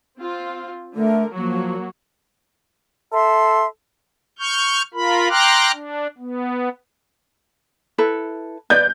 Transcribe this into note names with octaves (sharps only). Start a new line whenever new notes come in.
C4 F4
D3 A3 A#4
F3 F#3 A#3 F#4
A4 E5 C6
C#6 F6 G6
F4 A#4 B5
G5 A#5 C6 D6 F6 F#6
D4
B3
E4 A4 B4
B4 D5 G6